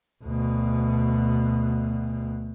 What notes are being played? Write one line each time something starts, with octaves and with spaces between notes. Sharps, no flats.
D2 B2